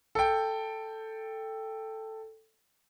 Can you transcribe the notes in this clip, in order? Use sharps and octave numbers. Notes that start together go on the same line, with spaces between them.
A4 G5